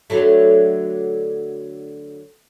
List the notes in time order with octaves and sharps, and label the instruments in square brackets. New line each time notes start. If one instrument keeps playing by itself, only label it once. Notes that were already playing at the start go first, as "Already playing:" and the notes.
[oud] D3 F#3 A3